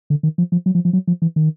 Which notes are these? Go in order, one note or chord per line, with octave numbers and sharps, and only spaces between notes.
D3
D#3
F3
F3
F#3
F3
F3
F#3
F3
E3
D#3